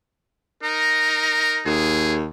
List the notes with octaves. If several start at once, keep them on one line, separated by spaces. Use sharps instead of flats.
D#4 A#4
D#2 G#4